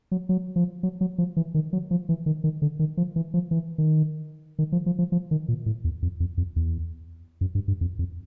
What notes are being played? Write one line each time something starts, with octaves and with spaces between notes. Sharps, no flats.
F#3
F#3
F3
F#3
F#3
F3
E3
D#3
F#3
F3
E3
D#3
D#3
D3
D#3
F3
E3
F3
E3
D#3
D#3
F3
F3
F3
F3
D#3
A#2
A2
E2
F2
F2
F2
E2
F#2
G2
G2
F2
F2